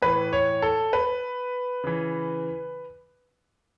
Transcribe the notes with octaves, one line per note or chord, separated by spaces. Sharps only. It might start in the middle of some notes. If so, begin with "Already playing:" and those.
A2 E3 B4
C#5
A4
B4
C#3 E3